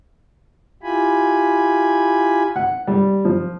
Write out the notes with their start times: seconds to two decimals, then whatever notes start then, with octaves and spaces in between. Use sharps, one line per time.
0.83 E4 F4 G4 G#5 B5
2.56 F#5
2.87 G3
3.25 F3